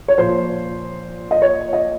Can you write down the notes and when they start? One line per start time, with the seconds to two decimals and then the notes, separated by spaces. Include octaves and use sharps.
0.08 C#5
0.18 A#2 F3 C5
1.31 D#5
1.42 C#5
1.73 D#5